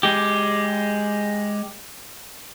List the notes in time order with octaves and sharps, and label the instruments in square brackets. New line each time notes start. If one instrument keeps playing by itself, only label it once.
[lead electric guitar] G#3 G4